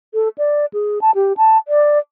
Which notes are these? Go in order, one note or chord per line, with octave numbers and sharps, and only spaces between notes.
A4
D5
G#4
A5
G4
A5
D5